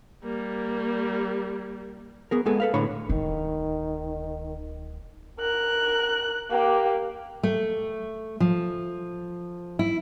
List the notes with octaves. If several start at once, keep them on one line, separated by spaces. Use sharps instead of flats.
G3 A#3
B3 G#4 A#4
G#3 A#3 B3 G#4 A4
A4 B4 F5
A2 D3 C#5 B5
D1 D#3 D#4
A#4 F#6
A#3 G4
A3
F3
E4